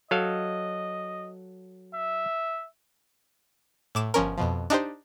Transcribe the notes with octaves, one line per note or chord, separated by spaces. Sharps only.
F#3 A4 D#5 F5
E5
A2 D6 E7
G1 F3 C#4 A#4
F2 B2 F3
D4 D#4 G4 C5